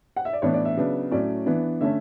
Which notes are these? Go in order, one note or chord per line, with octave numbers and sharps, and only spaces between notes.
F#5
E5
D5
A2 E3 B3 D4 C#5
D5
E5
C#3 F#3 B3 D4
A2 F#3 A3 C#4 D5
E3 B3 D4
D3 A3 C#4 E5